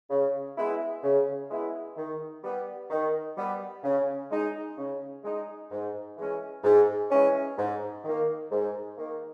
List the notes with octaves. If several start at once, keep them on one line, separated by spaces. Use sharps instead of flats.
C#3
G#3 B3 E4
C#3
G#3 B3 E4
D#3
G3 B3
D#3
G3 B3
C#3
G#3 D#4
C#3
G#3 D#4
G#2
E3 G#3 C#4
G#2
E3 G#3 C#4
G#2
D#3 A#3
G#2
D#3 A#3